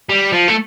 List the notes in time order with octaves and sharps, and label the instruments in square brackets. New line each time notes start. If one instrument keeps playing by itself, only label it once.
[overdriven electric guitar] G3
F3
A3